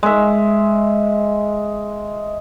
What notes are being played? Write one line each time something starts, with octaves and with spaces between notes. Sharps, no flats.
G#3 E5